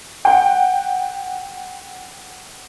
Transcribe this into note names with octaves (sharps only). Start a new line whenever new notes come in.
F#5 G5